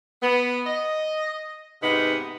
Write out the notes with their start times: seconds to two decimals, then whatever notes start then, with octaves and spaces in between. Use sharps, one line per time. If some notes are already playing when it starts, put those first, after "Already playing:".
0.23 B3
0.66 D#5
1.81 G#2 C3 B3 D#4